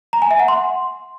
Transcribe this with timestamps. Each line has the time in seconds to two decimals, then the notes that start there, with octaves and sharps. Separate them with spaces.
0.13 A#5
0.22 G#5
0.31 E5
0.39 F#5
0.48 C6